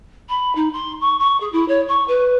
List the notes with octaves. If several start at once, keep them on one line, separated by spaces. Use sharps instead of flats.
B5
D#4
C6
C#6
C#6
G#4
E4
C#5
C#6
B4